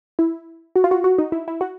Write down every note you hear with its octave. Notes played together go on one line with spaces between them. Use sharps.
E4
F#4
F4
F#4
F#4
D#4
E4
E4
F#4